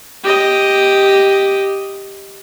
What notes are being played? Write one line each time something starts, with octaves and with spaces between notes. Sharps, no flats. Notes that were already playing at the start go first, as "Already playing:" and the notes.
G4 D#5